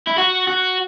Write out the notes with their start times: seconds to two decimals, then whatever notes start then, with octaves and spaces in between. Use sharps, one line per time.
0.07 E4
0.18 F#4
0.48 F#4